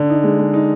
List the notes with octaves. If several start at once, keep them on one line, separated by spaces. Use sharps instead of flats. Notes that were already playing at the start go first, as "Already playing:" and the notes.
Already playing: D3
D#4
G#3
G#3
D#4